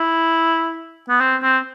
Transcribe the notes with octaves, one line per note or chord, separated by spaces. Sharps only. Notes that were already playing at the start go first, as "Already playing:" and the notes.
Already playing: E4
B3
C4
C4